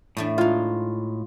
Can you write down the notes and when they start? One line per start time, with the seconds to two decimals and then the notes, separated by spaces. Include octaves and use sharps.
0.17 E2 A2 A3 D4
0.38 G#3 D#4 F4